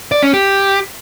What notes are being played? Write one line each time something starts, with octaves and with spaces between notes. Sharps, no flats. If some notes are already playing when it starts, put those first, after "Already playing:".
D5
C#4
G4